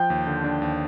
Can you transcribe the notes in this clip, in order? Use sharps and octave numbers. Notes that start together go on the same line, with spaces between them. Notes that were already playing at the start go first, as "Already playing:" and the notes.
Already playing: F3 G5
D#2
D3
D4
D#2